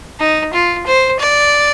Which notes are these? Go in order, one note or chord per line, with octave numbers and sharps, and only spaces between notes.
D#4
F4
C5
D5